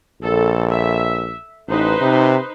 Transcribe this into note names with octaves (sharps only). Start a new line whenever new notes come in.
A#1 A4
E5
A1 D#4 B4 C5
C3